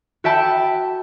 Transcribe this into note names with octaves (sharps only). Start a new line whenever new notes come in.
F#4 E5 G5 A5 B5